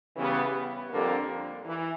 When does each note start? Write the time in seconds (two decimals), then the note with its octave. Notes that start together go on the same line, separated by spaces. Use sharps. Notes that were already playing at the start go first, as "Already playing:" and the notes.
0.16 C#3 E3 G3 B3
0.90 F2 D3 G3 A#3
1.65 E3